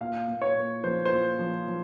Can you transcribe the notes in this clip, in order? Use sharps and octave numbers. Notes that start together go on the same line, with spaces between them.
A#2 F5
A#2
C#5
A#2
F3 C5
C5
A#2
F3
F3